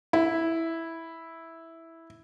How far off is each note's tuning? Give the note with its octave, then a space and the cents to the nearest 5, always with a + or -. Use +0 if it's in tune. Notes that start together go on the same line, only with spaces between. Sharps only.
E4 -5